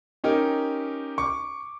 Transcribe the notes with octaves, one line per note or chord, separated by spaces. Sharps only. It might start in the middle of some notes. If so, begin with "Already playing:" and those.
C#4 D#4 G4 A#4
C#6 D6